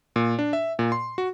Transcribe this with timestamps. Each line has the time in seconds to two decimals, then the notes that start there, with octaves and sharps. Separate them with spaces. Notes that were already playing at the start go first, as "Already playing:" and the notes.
0.16 A#2
0.39 D4
0.53 E5
0.79 A#2
0.92 C6
1.18 F#4